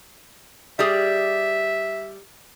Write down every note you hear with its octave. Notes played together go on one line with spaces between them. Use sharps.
G3 G4 G#4 E5